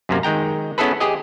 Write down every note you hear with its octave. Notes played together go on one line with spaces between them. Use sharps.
F#2 C3 A#3
D#3 G#3 G5 A#5
B3 C#4 E4 G#4 A4 B4
G4 G#4 D#5